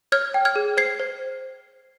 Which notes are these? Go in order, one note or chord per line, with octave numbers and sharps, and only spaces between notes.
C#5 F6 G#6
G5
F6 G#6
G#4
C5 G#6 C7
C5